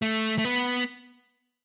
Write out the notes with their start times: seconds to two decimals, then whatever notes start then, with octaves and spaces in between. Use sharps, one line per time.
0.02 A3
0.38 A3
0.45 B3